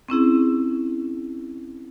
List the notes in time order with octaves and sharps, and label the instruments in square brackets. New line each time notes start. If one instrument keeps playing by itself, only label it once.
[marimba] C4 C#4 E4 G#4